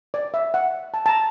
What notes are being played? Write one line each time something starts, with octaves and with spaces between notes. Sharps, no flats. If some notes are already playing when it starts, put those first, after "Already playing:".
D5
E5
F#5
A5
A5
A#5